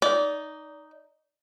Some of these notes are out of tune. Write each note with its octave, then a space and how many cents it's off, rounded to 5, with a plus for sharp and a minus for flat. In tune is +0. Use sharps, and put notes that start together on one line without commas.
D#4 +0 D5 -25